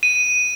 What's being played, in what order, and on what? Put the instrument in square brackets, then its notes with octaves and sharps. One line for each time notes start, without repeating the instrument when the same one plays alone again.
[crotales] D#7